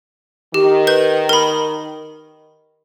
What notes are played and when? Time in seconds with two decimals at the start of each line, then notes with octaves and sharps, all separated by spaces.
0.54 D#3 G4
0.87 B4 G6
1.29 A#4 B5